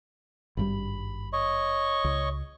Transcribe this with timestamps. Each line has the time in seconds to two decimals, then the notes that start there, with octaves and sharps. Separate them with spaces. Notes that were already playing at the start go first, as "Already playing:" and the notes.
0.57 G#1 G2 G3 B5
1.33 C#5 D#5 C#6
2.04 C#2